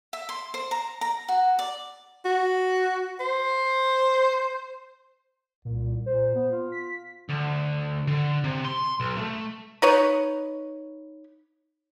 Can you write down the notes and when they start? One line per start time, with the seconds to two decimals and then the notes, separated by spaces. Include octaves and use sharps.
0.13 E5
0.29 C6
0.54 C5
0.71 A#5
1.01 A#5
1.28 F#4
1.59 D5
2.25 F#4
3.20 C5
5.65 C2 A#2
6.06 A#2 C5
6.35 B3
6.52 F4
6.72 B6
7.29 D2
8.07 D3
8.44 C3
8.64 C6
9.00 B1
9.18 A3
9.82 D#4 B4 C#5